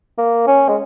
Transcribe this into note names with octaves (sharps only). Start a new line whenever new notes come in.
A#3
C#4
G#3